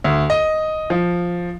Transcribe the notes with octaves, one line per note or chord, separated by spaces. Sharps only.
D2
D#5
F3